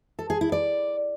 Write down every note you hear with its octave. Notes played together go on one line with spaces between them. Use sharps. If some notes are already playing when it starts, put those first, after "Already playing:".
A4
G#4
E4
D5